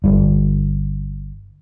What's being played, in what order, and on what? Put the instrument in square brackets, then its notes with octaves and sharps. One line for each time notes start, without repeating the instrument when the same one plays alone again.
[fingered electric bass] G1 G2